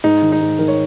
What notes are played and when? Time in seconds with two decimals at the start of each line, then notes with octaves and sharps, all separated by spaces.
0.04 G#2 D#4
0.22 D#3
0.32 D#4
0.41 G#2
0.59 D#3 A#4
0.68 C#5